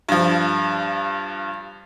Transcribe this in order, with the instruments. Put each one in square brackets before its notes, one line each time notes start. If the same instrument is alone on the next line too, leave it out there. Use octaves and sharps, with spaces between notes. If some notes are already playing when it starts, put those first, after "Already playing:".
[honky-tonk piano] G2 F3